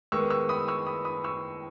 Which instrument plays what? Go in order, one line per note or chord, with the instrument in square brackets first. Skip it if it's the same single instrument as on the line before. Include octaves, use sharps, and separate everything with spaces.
[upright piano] D#3 G#3 B3 C#6 E6
C#6 E6
B5 D#6
C#6 E6
B5 D#6
B5 D#6
C#6 E6